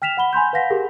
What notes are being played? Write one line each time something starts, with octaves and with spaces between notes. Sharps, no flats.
G5 F6 B6 E7 F7
F#5 B5 G7
G#5 B5 C6 G6
B4 F5 F#5 A#6 B6
G4 G#4 A#4